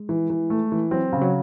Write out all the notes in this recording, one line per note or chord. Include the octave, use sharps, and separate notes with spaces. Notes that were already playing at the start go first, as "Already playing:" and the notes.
Already playing: G#3
E3
E3
A3
E3
F#3 C4
C#3
F#3